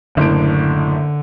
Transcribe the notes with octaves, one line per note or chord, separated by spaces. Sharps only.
F#1 A2 D3 D7